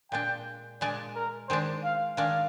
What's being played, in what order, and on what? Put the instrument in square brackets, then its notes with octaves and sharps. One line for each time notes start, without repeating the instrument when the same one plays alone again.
[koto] A#2 G#3 D4 [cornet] G5
[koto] A#2 G#3 D4 [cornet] D5
[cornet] A#4
[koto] D#3 G#3 D4 [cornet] C5
[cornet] F5
[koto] D#3 G#3 D4 [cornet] F5